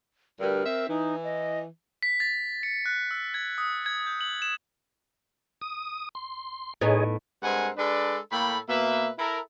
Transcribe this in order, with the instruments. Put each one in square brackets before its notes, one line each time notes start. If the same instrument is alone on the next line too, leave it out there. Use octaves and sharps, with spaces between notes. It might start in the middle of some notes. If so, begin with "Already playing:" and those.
[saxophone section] D2 G2 [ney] A#4
[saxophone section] C4 E5
[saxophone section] E3 [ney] D#4
[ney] D#5
[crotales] B6
A6
C#7
F#6
E6
G#6
D#6
G#6
G6
F#7
E7
[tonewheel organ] D#6
C6
[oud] A2 B3 D#4 [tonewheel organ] G#4 C#5 D#5
[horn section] G2 G#3 C4 A#4 F#5 G#5
G#3 D4 A4 B4 D5
A2 A#3 A4 G5 B5
B2 A#3 B4 E5
E4 A4 A#4